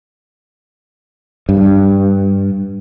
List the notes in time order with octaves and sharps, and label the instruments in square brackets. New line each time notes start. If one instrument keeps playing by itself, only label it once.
[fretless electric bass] G2